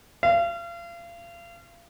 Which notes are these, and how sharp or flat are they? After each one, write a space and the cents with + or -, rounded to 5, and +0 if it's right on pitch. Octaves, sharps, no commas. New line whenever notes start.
F5 -35